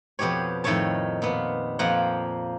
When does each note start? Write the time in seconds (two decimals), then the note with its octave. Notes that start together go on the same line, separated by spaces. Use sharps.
0.19 F2 B2 B3 G4 C#5
0.64 F2 A2 D#3 A3 C#5 A5
1.22 A#2 B3
1.79 F2 A#2 F3 A#3 F#5